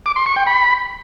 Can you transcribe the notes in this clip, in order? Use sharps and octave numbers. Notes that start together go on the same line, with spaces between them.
D6
C6
C#6
G5
B5